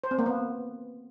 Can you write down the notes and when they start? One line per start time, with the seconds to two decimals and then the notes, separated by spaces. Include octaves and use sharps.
0.04 C5
0.11 C4
0.19 A#3
0.26 B3